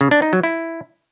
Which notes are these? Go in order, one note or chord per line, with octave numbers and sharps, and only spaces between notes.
C#3
D4
D#4
F#3
E4